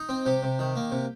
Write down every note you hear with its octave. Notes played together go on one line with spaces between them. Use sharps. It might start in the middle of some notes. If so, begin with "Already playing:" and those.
Already playing: D#4
C4
C3 G4
C3
D#3
A#3
C3